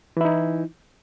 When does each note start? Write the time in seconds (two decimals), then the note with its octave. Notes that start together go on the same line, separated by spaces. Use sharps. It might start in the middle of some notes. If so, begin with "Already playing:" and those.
0.17 E3
0.21 E4
0.25 D#4